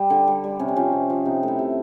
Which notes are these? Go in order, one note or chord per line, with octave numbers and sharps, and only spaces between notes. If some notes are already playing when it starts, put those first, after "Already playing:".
Already playing: G3
D3
G3
G3
C3 C#4
D4
F3 C#4
C3
F3
C3 D#4
A3 E4
C3